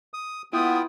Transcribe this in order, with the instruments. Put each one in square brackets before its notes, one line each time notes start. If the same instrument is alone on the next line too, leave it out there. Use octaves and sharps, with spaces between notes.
[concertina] D#6
[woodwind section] B3 [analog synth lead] E4 [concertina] F4 G5 [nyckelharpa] D#6